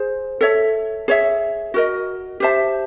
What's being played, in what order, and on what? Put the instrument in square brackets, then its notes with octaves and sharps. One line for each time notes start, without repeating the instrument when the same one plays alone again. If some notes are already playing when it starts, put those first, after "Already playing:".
Already playing: [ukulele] G#4 C5
A4 C#5 E5
G#4 C#5 E5
F#4 A#4 D#5
G4 C5 E5 A5